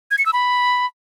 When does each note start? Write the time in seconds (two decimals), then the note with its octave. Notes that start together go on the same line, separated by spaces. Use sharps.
0.11 G#6
0.18 C#7
0.26 E6
0.33 B5